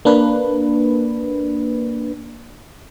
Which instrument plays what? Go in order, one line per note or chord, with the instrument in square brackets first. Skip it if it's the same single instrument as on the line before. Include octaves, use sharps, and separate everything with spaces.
[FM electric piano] A#3 D4 B4